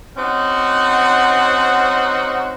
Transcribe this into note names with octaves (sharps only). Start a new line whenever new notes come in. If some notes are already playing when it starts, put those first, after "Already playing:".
C4 C#4 D#4 F#4 F#5